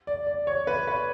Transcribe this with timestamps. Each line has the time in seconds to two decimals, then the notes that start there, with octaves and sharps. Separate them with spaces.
0.07 D5
0.27 D5
0.47 C#5
0.67 B4
0.87 B4